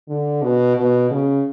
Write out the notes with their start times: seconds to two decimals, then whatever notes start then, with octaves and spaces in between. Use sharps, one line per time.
0.08 D3
0.42 B2
0.76 B2
1.11 C#3